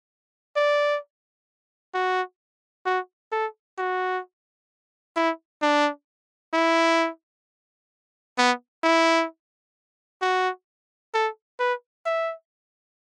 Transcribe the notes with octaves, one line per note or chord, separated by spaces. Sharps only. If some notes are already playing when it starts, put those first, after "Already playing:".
D5
F#4
F#4
A4
F#4
E4
D4
E4
B3
E4
F#4
A4
B4
E5